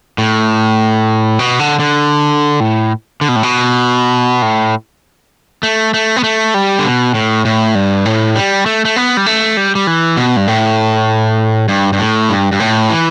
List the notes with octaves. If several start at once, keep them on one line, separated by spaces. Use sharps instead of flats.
A2
B2
D3
D3
A2
D3
B2
A2
B2
A2
A3
A3
B3
A3
G3
D3
B2
A2
A2
G2
A2
G3
A3
A3
B3
G3
A3
G3
G3
E3
B2
G2
A2
G2
G2
A2
G2
G2
A2
E3